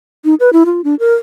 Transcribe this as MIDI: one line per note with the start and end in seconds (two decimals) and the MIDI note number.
0.25 0.34 63
0.40 0.50 71
0.53 0.63 64
0.66 0.81 65
0.84 0.95 62
1.00 1.14 70